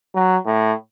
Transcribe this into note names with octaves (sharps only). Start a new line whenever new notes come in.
F#3
A2